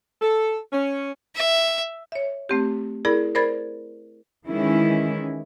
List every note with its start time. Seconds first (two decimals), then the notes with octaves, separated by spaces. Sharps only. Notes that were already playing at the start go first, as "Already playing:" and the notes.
0.22 A4
0.72 C#4
1.36 E5
2.12 C#5 E5
2.49 A3 C4 G4
3.05 E4 G#4 A#4 D5 B5
3.35 A#4 C5 D5 B5 G#6 A6
4.48 D#3 E3 G#3 C#4 E4